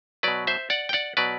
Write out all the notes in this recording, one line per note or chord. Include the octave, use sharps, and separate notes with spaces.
B2 F#3 B4 D5
C5 E5
D5 F#5
G5
D5 F#5
B2 F#3 B4 D5